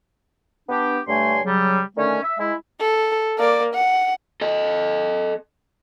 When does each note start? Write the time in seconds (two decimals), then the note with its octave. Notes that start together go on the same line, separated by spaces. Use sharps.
0.69 B3 D4 G4
1.08 G2 D3 A3 C#5 G#5 C6
1.45 C#3 F#3 G3
1.96 D3 D#3 A3 C#4
2.23 E5
2.39 G#3 E4
2.81 A4
3.38 A#3 D5
3.74 F#5
4.41 A4 D#5